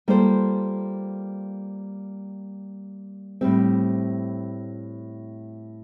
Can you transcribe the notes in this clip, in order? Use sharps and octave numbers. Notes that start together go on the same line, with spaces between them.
G3 A#3 F4 A4 C5
A2 G3 C4